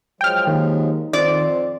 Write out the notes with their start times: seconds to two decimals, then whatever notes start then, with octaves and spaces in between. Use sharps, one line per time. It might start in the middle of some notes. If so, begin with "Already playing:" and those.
0.21 F3 F#3 G#3 G5 F6
0.47 D#2 D#3
1.13 F2 C5 D5